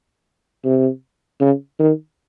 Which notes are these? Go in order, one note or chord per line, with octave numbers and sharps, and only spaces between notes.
C3
C#3
D#3